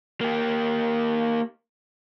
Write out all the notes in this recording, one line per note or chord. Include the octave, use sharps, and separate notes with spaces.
A#3 G4